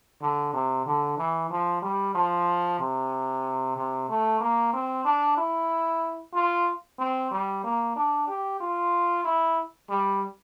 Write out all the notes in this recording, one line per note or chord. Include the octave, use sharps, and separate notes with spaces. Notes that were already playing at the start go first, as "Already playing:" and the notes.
D3
C3
D3
E3
F3
G3
F3
C3
C3
A3
A#3
C4
D4
E4
F4
C4
G3
A#3
D4
G4
F4
E4
G3